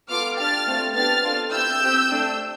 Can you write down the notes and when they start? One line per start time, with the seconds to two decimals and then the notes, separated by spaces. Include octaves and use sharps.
0.10 B3 F4 A4 D6 F6
0.38 D4 G4 F6 A6
0.66 A3 C4 F4
0.95 B3 D4 G4 F6 A6
1.23 D4 F4 A4
1.51 C4 E4 G4 E6 G6
1.80 C4 G4
2.08 A3 D4 G4